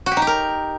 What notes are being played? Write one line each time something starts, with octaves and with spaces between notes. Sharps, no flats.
F#4
G4
D#4
G4
A#4